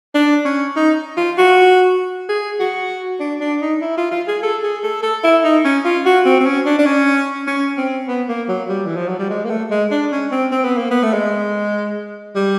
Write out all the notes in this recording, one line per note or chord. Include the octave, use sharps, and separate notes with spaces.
D4
C#4
D#4
F4
F#4
G#4
F#4
D4
D4
D#4
E4
F4
F4
G#4
A4
G#4
A4
A4
E4
D#4
C#4
F4
F#4
C4
C4
C#4
D4
D4
C#4
C#4
C4
B3
A#3
F#3
G3
E3
F3
F#3
G3
G#3
A#3
A3
G#3
D4
C#4
C4
C4
B3
A#3
B3
A3
G#3
G3